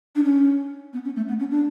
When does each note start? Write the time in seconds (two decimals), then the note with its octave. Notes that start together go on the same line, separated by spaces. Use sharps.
0.16 D4
0.24 C#4
0.93 B3
1.04 C#4
1.16 A3
1.28 B3
1.39 C#4
1.51 D4